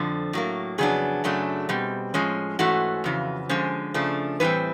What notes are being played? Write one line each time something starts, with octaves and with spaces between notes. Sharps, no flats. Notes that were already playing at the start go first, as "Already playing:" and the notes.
Already playing: F2 D3 F3
A2 F#3 A#3
F2 C#3 F#3 B3 D4 G#4
F#2 C#3 F#3 A3 D4
B2 G3 C4
A2 F3 G#3 C#4
G#2 E3 A3 C#4 F#4
F2 C#3 E3
D3 F3 G#3 C#4 C5
C#3 F3 A3 D4
A2 E3 G3 C4 B4